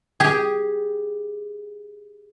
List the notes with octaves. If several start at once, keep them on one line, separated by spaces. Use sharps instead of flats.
G4 G#4